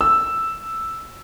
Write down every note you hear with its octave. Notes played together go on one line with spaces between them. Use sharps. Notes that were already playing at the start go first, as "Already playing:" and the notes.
E6